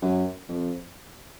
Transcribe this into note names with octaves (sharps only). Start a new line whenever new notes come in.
F#2
F2